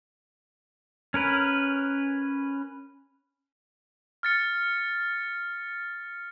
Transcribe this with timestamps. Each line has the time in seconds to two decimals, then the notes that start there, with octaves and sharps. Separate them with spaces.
1.14 C#4 A#4 B4
4.23 F6 A6 C#7